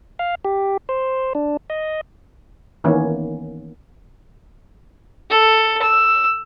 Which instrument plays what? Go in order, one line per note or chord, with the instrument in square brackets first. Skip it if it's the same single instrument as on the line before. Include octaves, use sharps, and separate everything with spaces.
[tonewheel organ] F5
G4
C5
D4
D#5
[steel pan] D#3 E3 A#3 B3 C#4
[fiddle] A4
E6